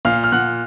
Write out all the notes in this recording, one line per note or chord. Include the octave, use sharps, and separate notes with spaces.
A#2 F5 F6
F6
A#2 F#5 F#6